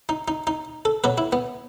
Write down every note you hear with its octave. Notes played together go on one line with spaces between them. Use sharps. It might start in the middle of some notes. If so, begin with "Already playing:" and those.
D#4
D#4
D#4
A4
B2 F#3 B4
E4
B3